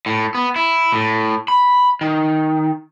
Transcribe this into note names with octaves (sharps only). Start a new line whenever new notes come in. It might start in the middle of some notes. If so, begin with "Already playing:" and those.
A2
B3
E4
A2
B5
D#3